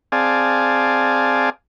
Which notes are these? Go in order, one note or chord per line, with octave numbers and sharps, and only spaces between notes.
C4 G#4 D5 F5 G#5 A5